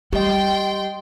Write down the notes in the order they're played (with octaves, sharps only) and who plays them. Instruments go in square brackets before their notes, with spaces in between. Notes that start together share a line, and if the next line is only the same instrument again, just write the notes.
[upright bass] G3 [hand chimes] G4 D#5 [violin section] G5 C6